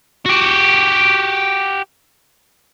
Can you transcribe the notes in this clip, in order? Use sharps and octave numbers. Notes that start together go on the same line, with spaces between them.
F#4 G4